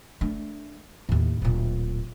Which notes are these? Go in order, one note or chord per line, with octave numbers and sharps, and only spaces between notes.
A3 D4
D#2 A2
D1 A#2